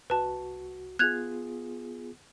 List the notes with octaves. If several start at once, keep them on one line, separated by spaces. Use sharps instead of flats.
C2 F#4 B4 A5
B3 F4 G#4 F#6 G#6 F7